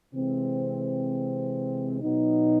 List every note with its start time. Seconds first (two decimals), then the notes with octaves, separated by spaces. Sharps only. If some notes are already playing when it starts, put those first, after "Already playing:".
0.13 C3 E3 G#3 C4
2.02 B2 F#3 B3 D#4